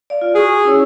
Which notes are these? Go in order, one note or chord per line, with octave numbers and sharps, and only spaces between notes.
D5 F5
F4
F#4 G#4 C#6
C#4 E4 C#5